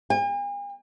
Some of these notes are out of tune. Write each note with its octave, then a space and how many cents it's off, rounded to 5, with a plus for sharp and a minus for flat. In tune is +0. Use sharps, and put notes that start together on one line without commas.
G#5 -45